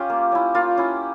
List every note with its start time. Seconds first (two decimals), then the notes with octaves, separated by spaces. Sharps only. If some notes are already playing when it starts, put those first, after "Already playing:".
Already playing: C#4 F4 G4
0.10 A#3
0.32 C#4 E4
0.54 A#3 F4
0.77 C#4 E4